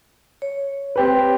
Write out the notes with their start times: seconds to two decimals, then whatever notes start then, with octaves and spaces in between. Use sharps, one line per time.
0.42 C#5
0.96 C4 G4 B4